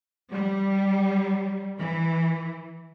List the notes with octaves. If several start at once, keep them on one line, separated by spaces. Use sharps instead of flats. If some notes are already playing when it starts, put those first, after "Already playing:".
G3
E3